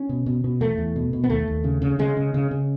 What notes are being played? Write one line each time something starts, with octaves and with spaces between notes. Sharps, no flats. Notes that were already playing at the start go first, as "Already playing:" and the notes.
Already playing: C#4
B2
B2
B2
E2 A3
E2
B2
B2
B3
D#2 A3
D#2
C#3
C#3
C#3 G#3
C#3
C#3
C#3